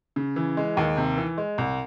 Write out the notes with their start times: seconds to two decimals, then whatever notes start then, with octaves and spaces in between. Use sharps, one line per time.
0.16 C#3
0.36 E3
0.57 G#3
0.77 D#2
0.97 C3
1.17 E3
1.38 G#3
1.58 C2